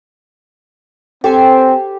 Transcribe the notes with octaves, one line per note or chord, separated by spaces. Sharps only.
C4 G4 A4 C5 G#5